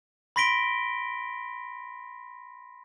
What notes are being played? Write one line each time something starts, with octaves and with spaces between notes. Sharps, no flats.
B5 C6 A#6 B6 D7 G7